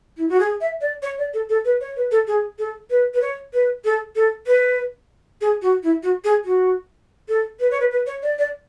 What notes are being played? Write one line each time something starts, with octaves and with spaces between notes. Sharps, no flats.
E4
F#4
G#4
E5
D5
C#5
D5
A4
A4
B4
C#5
B4
A4
G#4
A4
B4
B4
C#5
B4
A4
A4
B4
G#4
F#4
E4
F#4
G#4
F#4
A4
B4
C#5
B4
B4
C#5
D5
D5